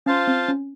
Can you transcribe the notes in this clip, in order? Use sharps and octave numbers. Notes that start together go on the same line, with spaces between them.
C#4 F4 C5 F5 A5
C4
C#4